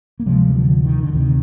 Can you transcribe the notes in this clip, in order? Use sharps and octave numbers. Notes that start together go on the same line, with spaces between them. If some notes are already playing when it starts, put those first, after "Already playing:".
A#3
D2 C3 F3 G#3
G3
D3 F3
D#3
D3
D2 C3 D#3